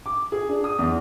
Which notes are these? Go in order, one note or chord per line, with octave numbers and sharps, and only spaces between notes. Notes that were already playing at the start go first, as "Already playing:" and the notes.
D6
G#4
D4
D#6
E2